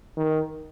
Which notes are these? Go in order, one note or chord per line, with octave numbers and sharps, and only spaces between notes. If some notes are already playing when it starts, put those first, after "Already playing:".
D#3